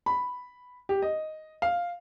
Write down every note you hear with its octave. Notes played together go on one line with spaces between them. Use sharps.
B5
G4
D#5
F5